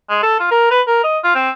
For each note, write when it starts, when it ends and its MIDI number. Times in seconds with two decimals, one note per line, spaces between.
0.10 0.20 56
0.23 0.39 69
0.40 0.49 65
0.51 0.70 70
0.71 0.81 71
0.87 1.02 70
1.04 1.19 75
1.24 1.33 65
1.35 1.50 60